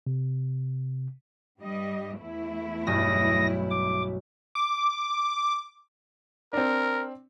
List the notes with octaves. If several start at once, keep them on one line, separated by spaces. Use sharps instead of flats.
C3
G2 G3 D#5
E2 A3 E4
B1 G2 D#6 A#6
D6
D6
C4 D4 A#4